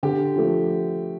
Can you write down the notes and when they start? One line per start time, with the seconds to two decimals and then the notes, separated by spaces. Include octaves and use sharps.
0.03 D3 G4
0.36 F3 A3